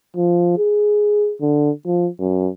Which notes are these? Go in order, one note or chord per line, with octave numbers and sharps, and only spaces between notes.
F3
G#4
D3
F3
F#2